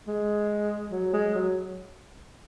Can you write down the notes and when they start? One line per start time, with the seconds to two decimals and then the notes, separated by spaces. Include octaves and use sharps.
0.08 G#3
0.92 F#3
1.13 G#3
1.35 F#3